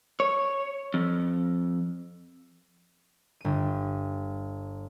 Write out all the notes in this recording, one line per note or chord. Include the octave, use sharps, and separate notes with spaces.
C#5
F2
G1 D#7